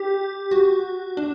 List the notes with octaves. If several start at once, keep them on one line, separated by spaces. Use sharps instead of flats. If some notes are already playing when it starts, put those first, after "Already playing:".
Already playing: G4
F#4
D4